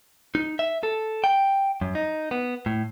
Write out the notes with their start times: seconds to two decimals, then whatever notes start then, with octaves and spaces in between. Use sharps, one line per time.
0.35 D#4
0.59 E5
0.83 A4
1.24 G5
1.81 F#2
1.95 D#4
2.31 B3
2.66 A2